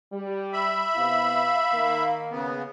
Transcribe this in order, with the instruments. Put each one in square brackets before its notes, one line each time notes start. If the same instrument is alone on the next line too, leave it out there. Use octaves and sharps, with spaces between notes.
[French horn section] G3
[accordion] E5 B5
[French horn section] C3 B3 E4 [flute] F5
[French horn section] D#3 A#3
[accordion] C#3 B3